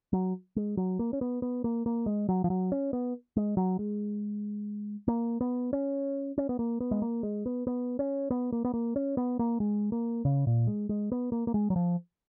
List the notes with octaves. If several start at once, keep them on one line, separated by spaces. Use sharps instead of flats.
F#3
G#3
F#3
A#3
C#4
B3
B3
A#3
A#3
G#3
F#3
F3
F#3
C#4
B3
G#3
F#3
G#3
A#3
B3
C#4
C#4
B3
A#3
B3
G#3
A#3
G#3
B3
B3
C#4
B3
A#3
B3
A#3
C#4
B3
A#3
G#3
A#3
C#3
A#2
G#3
G#3
B3
A#3
A#3
G#3
F#3
F3